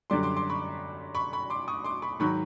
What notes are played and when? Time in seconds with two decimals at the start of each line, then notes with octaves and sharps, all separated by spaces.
0.10 F#2 D3 G3 C6 D6
0.23 C6 D6
0.36 C6 D6
0.49 B5 C#6
1.15 B5 C#6
1.33 B5 C#6
1.50 C6 D6
1.68 C#6 D#6
1.84 C6 D6
2.02 B5 C#6
2.19 G#2 D#3 F#3 B5 C#6